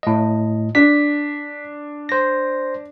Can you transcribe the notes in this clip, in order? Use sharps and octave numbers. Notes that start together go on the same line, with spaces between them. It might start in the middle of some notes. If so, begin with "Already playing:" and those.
A2 D#5
D4 B6
C5 A#6